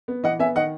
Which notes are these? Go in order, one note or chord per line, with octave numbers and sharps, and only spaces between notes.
B3
E3 D#5 F#5
B3 E5 G#5
D#3 D#5 F#5